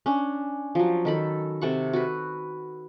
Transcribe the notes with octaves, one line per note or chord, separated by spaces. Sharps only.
C#4 D4
F3 F#3
D#3 A4 B5
C3 A4 F#5 C#6
F#4 B4